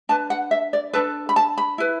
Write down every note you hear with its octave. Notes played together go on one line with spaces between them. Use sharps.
D4 B4 A5
F#5
E5
D5
D4 A4 B4
B5
A5
B5
E4 B4